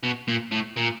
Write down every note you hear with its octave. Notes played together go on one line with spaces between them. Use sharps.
B2
A#2
A2
A#2